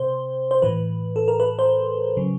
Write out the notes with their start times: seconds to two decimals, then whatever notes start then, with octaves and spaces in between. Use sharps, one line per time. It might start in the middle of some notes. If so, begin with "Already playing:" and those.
Already playing: C3 C5
0.51 C5
0.62 A2 E3 B4
1.16 A4
1.28 A#4
1.40 B4
1.59 C5
2.17 C#3 F#3